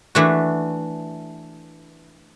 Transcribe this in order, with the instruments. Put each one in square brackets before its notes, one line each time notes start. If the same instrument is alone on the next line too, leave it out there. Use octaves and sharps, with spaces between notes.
[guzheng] E3 A3 D4 F#4